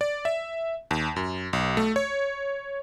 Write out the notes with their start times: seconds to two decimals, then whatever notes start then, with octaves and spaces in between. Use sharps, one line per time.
0.01 D5
0.25 E5
0.91 D#2
1.16 F#2
1.53 B1
1.77 A3
1.96 C#5